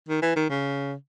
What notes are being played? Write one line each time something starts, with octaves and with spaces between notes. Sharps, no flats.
D#3
E3
D#3
C#3